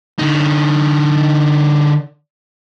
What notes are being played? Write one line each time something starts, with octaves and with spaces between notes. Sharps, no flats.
D3 D#4